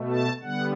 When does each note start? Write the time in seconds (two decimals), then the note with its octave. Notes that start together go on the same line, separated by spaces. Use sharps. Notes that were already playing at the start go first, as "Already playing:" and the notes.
Already playing: B2 A3
0.10 A5
0.42 D3 G3 B3 F#5